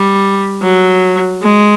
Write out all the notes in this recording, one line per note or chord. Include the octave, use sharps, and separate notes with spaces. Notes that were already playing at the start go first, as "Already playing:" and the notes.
Already playing: G3
F#3
G#3